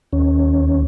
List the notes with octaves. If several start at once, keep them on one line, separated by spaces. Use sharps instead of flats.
D#2 C#4